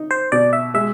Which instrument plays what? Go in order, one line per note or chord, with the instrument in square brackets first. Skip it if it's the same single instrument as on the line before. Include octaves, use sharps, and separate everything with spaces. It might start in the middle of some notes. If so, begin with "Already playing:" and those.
Already playing: [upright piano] D#4
[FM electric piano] C5
[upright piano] B2 [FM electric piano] D5
[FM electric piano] E5
[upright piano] G#3 [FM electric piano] E5